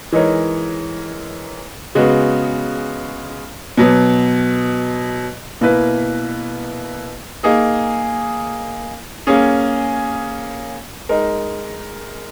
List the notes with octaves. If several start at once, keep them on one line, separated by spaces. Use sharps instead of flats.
E3 G#3 D#4 A#4 C#5
C#3 G#3 B3 F#4
B2 F#3 B3
B2 A#3 E4 B4
A#3 D#4 G#4
A#3 C#4 G#4
G#3 D#4 A#4